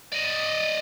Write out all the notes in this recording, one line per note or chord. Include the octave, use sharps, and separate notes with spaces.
D5 D#5